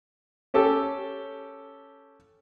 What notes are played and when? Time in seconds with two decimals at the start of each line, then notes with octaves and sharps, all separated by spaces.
0.54 C#4 G4 A4